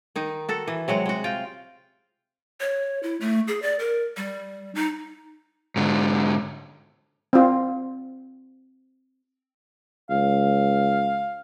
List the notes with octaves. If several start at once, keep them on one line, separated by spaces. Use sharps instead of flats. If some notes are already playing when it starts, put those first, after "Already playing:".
D#3 D#4
F#4 A4
E3
C3 F#3 G#3 F#4
G#3 F#4
F4 G5
C#5
E4
A3
G#4
D5
A#4
G3
D#4
G#2 D3
C4 F4
C#2 F5